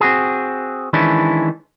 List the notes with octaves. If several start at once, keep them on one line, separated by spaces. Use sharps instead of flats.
C4 F#4 G#4
D#3 E3 G#3 C#4 D4 E4